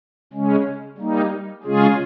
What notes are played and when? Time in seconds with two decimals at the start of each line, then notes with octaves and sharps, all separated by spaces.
0.33 C#3 G#3 C#4
0.98 G3 A#3 D#4
1.64 C#3 G#3 C#4 F4 G#4